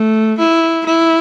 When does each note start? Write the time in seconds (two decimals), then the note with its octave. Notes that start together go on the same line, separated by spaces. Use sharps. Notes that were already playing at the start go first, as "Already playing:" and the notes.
Already playing: A3
0.38 E4
0.85 E4